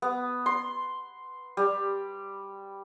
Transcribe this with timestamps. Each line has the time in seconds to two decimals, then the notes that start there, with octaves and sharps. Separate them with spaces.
0.02 B3
0.46 C6
1.57 G3